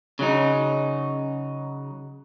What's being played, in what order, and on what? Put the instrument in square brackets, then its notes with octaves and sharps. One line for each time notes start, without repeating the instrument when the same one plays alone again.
[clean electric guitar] C#3 F#3 D#4